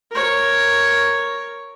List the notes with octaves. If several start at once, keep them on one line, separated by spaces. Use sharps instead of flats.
A#4 C#5